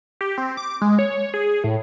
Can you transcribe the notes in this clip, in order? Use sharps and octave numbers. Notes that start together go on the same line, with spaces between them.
G4
C4
D6
G#3
C#5
G#4
A2